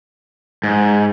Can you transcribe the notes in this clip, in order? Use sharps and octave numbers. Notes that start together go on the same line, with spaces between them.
G#2